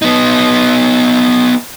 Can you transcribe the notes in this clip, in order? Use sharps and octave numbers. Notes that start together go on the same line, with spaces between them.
B3 D#4